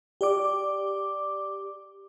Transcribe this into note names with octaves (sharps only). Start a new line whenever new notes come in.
G4 D5 D6